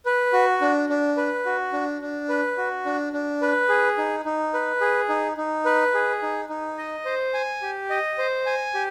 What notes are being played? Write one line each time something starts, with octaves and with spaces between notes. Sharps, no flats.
B4
F#4
D4
D4
B4
F#4
D4
D4
B4
F#4
D4
D4
B4
G#4
D#4
D#4
B4
G#4
D#4
D#4
B4
G#4
D#4
D#4
D#5
C5
G#5
G4
D#5
C5
G#5
G4